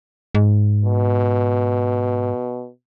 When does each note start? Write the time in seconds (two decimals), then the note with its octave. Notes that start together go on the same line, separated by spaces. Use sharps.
0.35 G#2
0.85 B2